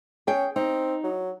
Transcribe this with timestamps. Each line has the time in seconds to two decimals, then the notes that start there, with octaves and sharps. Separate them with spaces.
0.27 C#4 G#4 G5
0.56 C4 D#4
1.04 F#3